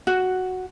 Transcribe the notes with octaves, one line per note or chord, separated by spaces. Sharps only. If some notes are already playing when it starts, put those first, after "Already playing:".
F#4